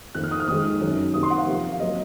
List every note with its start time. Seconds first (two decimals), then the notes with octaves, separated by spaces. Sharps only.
0.15 F2 D#3 A#3 F#6
0.24 F6
0.31 D#6
0.40 F6
0.48 F2 D#3 G#3 D#6
0.81 F#2 D#3 F#3
1.14 C3 D#3 A#3 D#6
1.23 C6
1.30 F#5
1.38 F5
1.47 C3 F3 A#3
1.73 F5
1.80 F#3 A#3 D#5